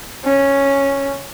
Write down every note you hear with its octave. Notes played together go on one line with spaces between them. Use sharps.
C#4